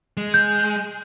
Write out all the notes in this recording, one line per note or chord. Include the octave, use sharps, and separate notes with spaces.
G#3
G6